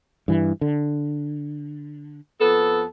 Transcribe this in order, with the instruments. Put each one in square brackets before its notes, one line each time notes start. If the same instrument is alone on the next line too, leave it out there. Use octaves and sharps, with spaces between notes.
[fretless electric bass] G2 E3
D3
[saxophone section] F2 B3 A4